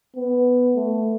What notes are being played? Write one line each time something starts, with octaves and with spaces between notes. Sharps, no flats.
B3
A3